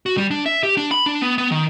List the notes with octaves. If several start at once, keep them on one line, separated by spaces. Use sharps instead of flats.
F#4
G3
D4
E5
G4
D4
B5
D4
B3
B3
D#3